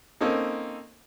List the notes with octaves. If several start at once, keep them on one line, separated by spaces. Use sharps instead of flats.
A#3 C4 C#4 D#4 A4